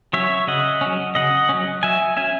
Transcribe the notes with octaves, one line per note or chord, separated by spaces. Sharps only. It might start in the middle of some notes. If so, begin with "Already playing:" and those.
F#3 C#4 C#5 E5
C#3 D#5 F#5
F#3 C#4
C#3 D#5 F#5
F#3 C#4
F#3 E5 G#5
C#4 E5 G#5